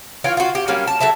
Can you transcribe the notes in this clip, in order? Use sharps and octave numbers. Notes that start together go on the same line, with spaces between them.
E3 F4 C#5 G5
F4 F#4
G4
F#3 G3 A#3 C#4
A5
F#3 A3 E5 A5